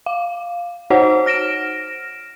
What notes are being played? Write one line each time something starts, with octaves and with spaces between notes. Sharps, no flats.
F5
D#4 F#4 C5 C#5 F#5
F6 A#6 D7 E7